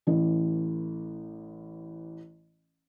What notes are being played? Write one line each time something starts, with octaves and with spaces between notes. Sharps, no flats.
A1 E3